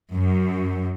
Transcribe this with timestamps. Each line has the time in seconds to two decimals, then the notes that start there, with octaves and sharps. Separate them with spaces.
0.14 F#2